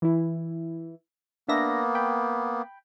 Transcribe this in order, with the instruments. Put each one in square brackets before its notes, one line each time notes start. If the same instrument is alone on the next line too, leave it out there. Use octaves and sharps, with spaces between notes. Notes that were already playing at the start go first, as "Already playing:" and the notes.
[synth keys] E3 E4
[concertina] A#3 B3 [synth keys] D4 E5 A#6
[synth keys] G5 B5